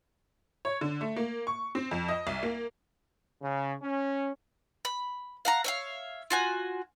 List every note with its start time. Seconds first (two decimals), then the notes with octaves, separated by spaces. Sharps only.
0.65 C#5
0.81 D3
1.01 A3
1.16 A#3
1.47 C#6
1.75 C4
1.91 F2
2.08 D#5
2.27 C2
2.43 A#3
3.42 C#3
3.83 C#4
4.85 B5
5.45 F5 F#5 A#5
5.64 C#5 E5 F5
6.30 F4 F#4 G#5